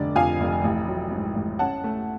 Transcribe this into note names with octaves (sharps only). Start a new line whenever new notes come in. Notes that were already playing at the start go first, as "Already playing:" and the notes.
Already playing: F1 D3 D5
F2 F5 G#5
F1
A1
F#3
G#2
A1
C#4 F#5 A5
A3